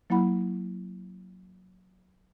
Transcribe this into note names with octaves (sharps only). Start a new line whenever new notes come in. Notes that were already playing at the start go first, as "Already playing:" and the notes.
F#3 A#3 E4 F#5 B5